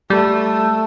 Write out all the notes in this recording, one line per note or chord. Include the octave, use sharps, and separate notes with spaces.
G3 A3